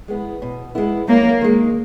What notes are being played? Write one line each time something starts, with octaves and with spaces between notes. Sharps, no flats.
G#3 B3 E4
B2
G#3 B3 E4
F#2 A#3
D#3 G#3